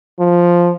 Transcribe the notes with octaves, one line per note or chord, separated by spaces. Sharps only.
F3